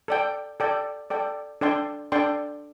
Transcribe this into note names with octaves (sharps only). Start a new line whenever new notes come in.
A4 D5 G5
A4 D5 G5
A4 D5 G5
D4 A4 D5 G5 C6
D4 A4 D5 G5 C6